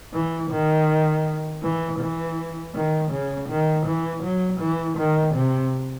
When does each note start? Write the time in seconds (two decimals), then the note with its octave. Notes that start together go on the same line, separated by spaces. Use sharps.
0.13 E3
0.51 D#3
1.63 E3
1.99 E3
2.74 D#3
3.11 C#3
3.49 D#3
3.86 E3
4.23 F#3
4.60 E3
4.98 D#3
5.35 C3